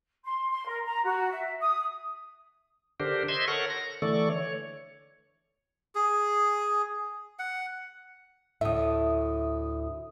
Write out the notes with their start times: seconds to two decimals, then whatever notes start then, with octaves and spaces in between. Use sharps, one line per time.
0.25 C6
0.50 C6
0.67 A#4
0.86 A#5
1.05 F#4
1.30 E5
1.61 D#6
3.00 D3 D4 G4 A#4 C5
3.29 C5 D#5 E5 C6 G#6
3.48 A4 A#4 C#5 F#5 C#6
3.70 A#6
4.02 D3 E3 A3 A4 D5 C#6
4.30 C#5
5.95 G#4
7.39 F#5
8.61 D2 A2 E5 D#6